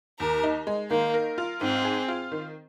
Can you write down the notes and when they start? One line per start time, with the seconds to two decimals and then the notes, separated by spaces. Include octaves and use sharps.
0.19 D#2 A#4
0.43 D#4
0.67 G#3
0.90 D#3 A#3
1.14 A#4
1.38 F4
1.61 G#2 C4
1.84 G#4
2.08 F4
2.32 D#3